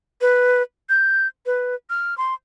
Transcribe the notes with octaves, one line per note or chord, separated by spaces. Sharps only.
B4
G6
B4
F6
C6